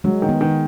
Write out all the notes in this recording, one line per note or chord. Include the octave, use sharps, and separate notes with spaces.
F#3 G#3
D#3
B3
D#3